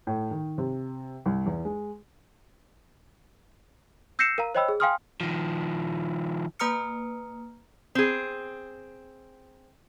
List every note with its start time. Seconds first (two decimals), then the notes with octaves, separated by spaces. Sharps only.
0.07 A2
0.31 D#3
0.58 C3
1.26 C2
1.46 E2
1.65 G#3
4.19 E6 G6 A#6 C7 C#7 E7
4.38 A#4 F5 A#5
4.55 C5 C#5 D#5 G5 B5 E6
4.69 G#4
4.80 F5 G5 G#5 C6 D#6 F6
5.21 D#3 F3
6.59 A#3 B4 A#5 D#6 F6 C#7
7.95 C4 G#4